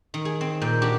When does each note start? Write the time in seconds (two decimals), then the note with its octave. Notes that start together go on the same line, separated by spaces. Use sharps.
0.14 D#3
0.25 G#4
0.41 C4
0.62 A#2 G5
0.82 D4 F#4 G4